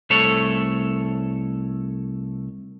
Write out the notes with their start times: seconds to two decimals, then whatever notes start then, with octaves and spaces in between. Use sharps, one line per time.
0.10 C2 A3 A4 C#5